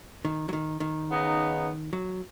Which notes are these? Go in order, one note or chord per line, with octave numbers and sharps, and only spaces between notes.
D#3
F#3
D#3
D#3
C#3 B3 D#4
F#3